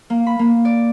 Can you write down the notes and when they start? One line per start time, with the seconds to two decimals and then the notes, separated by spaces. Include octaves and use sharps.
0.10 A#3
0.27 B5
0.39 A#3
0.65 D5